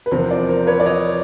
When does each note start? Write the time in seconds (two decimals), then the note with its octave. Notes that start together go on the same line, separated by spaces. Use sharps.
0.06 B4
0.11 E2 C3 F3 A#4 C5
0.30 C5 D5
0.48 A#4 C5
0.67 B4 C#5
0.80 D5
0.86 C#5 D#5